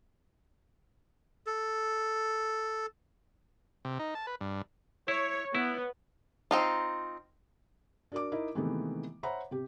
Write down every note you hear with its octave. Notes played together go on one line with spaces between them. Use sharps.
A4
C3
D#4
A5
B4
G2
E4 C#5
B3 E4
C4 D#4 F4
D4 F#4 A#4 D5 D6
D#4 E4 A#4 D#5
C3 D#3 E3 G#3 A3 B3
C5 C#5 E5 F#5 A#5 B5
C3 G4